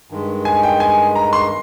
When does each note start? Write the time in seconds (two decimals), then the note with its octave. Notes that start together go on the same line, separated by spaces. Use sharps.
0.10 G2 D#3 G#3
0.45 G#5
0.63 G5
0.80 G#5
1.15 A#5
1.33 C6